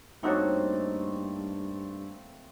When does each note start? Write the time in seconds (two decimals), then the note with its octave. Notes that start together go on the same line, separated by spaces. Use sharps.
0.23 G2 A3 A#3 C4 D#4 F#4 C#5